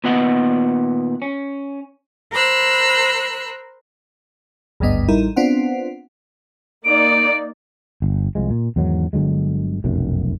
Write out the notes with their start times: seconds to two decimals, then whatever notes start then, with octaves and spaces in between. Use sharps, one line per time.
0.04 A#2 D#3 B3 B4 D#5 F#5
1.22 C#4
2.32 A#4 C5 B5 E6 F#6
4.80 G#1 D2 G2 D3 B3 D#5
5.08 A1 G3 D#4 E4 A#4
5.36 B3 C4 D4 F4 C5 F#5
6.85 A#3 D#4 D5 D7
8.02 G1
8.35 C2 F3 G#3
8.50 A#2
8.76 E2 G#2 D#3 F#3
9.13 G1 D3 F#3 G#3
9.84 F1 B1 F#2